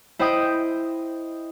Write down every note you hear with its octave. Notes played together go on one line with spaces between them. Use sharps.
E4 C5 D#5 G5 D#6